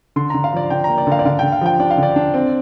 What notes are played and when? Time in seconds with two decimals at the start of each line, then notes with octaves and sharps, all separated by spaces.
0.16 D3 C6
0.30 D3 A#5
0.44 F5
0.53 F3 D5
0.70 D3 G5
0.84 A#3 A#5
0.98 D5
1.07 D3 F5
1.19 D5
1.25 D3 F5
1.39 D3 G5
1.52 F5
1.61 F3 G5
1.79 D4 D5
1.91 F5
1.98 D3
2.03 D5
2.16 D4
2.34 C4